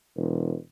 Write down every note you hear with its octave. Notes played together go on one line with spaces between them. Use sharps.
E1